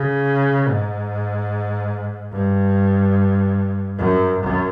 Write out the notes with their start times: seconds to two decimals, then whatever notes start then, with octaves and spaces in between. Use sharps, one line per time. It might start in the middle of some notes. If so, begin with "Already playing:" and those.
Already playing: C#3
0.68 G#2
2.33 G2
3.98 F#2
4.40 F#2